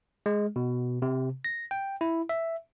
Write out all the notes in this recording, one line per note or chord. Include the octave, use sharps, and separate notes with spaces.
G#3
B2
C3
A#6
G5
E4
E5